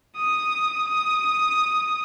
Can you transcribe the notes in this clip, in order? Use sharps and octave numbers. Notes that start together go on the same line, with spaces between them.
D#6
D#6